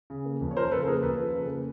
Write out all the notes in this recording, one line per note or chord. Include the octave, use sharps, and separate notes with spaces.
C#3
A#3
F2
C#5
F3 A#4 C5
C#3 A4 B4
A#3 G#4 A#4
F2 A4 B4
F3
C#3
A#3